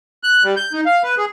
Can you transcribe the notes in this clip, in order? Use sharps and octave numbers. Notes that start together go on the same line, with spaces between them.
F#6
G3
G6
D#4
F5
B4
G#4